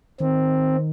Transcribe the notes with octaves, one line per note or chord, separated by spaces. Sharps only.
D#3 C4